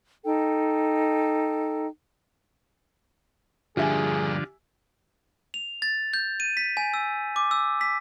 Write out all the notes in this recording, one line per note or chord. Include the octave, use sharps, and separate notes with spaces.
D#4 A4 G5
G2 A#2 D3 F3 G4 G#4 E5 G#5
F7
A6
G6
D#7
B6
G#5
E6
D6
E6
B6